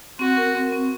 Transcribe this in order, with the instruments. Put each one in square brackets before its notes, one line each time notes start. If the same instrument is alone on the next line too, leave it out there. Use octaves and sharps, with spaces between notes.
[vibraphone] C4 [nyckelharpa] F#4
[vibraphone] A#4
C4
C4